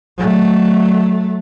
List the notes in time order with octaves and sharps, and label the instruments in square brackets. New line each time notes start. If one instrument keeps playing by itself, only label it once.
[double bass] F#3 A3